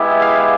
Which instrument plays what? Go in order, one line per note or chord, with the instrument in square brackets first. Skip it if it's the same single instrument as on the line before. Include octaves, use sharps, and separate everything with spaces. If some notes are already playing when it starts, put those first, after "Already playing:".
Already playing: [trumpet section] G#3 B3 E4 G4 [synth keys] E5
[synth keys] F5